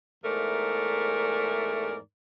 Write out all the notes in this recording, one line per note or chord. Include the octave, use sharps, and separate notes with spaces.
E2 G#2 A3 A#4 D5